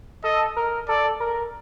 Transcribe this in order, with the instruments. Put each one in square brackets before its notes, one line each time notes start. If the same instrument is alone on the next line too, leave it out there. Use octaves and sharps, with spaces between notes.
[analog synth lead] A4 [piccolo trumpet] D#5
[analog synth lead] A#4
[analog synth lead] A4 [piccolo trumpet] D5
[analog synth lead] A#4